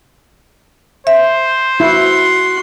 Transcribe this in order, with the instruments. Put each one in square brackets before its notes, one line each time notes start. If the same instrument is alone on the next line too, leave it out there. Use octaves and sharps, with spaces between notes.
[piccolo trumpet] C5 [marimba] E5
[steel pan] E4 [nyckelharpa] F#4 C6